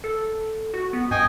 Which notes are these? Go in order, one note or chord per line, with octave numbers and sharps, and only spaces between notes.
A4
F#4
B3
G2 D#5 G5 G#5